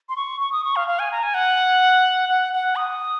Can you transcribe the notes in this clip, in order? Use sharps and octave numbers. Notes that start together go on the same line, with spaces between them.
C6
C#6
C#6
D#6
C#6
F5
F5
G#5
A#5
G#5
F#5
F#5
F#5
D#6